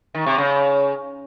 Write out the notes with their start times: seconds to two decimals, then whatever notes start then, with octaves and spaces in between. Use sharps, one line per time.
0.15 D#3
0.26 C3
0.38 C#3